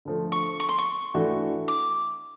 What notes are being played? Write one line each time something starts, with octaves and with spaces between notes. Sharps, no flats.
D3 F3 A3
C#6
C#6
C6
C#6
E3 A3 D4 F#4
D6